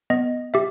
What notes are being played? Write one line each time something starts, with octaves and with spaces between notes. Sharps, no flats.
B3 D#5
G4 E5